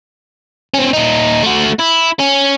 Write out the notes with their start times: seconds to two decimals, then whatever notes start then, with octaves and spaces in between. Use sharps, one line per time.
0.74 C4 C#4
0.93 A#2 D#4
1.43 A3 F#4
1.80 E4
2.20 C#4